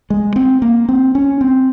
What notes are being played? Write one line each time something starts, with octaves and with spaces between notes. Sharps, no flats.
G#3
C4
A#3
C4
C#4
C4